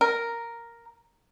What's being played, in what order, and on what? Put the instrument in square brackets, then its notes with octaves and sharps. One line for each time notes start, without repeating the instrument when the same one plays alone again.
[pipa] A#4